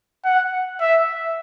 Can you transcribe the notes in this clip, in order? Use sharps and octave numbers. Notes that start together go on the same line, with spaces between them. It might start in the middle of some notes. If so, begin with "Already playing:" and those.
F#5
E5